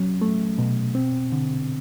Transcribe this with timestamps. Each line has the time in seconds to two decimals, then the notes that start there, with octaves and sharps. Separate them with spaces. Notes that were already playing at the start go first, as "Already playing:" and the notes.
Already playing: F#3 C#4
0.22 A3
0.58 B2
0.95 C4
1.32 D3